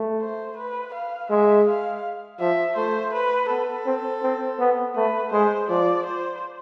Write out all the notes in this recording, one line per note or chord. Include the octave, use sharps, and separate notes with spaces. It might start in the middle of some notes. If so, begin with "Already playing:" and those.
Already playing: A3
C5
B4
F5
G#3 E5
F5
F3 E5
A3 C5
B4
B3 A4
C4
C4
B3
A3 B4
G#3 C5
F3 D5
C5